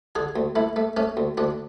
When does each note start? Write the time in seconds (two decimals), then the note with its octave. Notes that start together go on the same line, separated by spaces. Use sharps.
0.15 D3 G#4
0.36 D2
0.56 A3 E4
0.76 A3
0.97 A3 C#4
1.17 D2
1.37 D2 D4